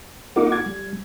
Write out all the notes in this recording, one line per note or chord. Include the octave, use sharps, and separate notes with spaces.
A#3 D#4 F4 F#5 D6
G#6
G3